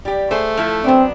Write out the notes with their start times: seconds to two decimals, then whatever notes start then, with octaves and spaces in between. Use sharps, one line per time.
0.05 G3 G4
0.31 A3 G#4 C5
0.57 F3 E4 A4
0.84 F#3 B3 C4 D4